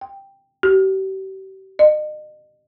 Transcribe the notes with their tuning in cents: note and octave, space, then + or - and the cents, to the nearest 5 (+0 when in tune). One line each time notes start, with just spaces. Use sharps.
G5 +5
G4 -40
D#5 -40